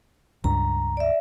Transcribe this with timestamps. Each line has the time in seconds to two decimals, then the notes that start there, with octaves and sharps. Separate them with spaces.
0.44 C#2 G2 A#5
0.97 D5 E5